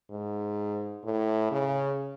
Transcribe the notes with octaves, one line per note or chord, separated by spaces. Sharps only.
G#2
A2
C#3